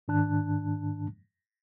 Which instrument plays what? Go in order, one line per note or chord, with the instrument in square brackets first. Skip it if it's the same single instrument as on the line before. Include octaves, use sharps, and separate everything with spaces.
[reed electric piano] G#2 D#3 D4 A5 F#6